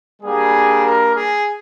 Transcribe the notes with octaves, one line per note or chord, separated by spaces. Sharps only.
G3 A#3 D4 G#4
A#4
G#4